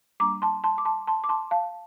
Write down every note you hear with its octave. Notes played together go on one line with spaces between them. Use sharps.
G3 A#3 D4 A#5 D6
A5 C6
A5 C6
D6
A5 C6
A5 C6
D6
A5 C6
F5 A5